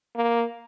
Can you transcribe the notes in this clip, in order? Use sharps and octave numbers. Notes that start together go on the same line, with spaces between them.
A#3